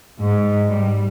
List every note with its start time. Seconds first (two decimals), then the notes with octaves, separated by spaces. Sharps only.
0.19 G#2
0.69 G3